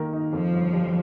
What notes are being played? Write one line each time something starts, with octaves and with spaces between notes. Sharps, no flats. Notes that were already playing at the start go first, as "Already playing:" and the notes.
Already playing: D#3 A#3 A#4
D#4
F2 F3
G1
G3